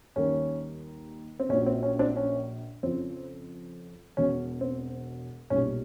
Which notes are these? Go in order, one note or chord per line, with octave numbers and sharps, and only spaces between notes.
D#2 D#3 G3 C#4
C4
A#1 A#2 F#3 C#4
C4
C#4
C4 D4
C#4
F2 C#3 F3 C4
E1 E2 B2 F#3 C#4
C4
B1 A#2 G3 C#4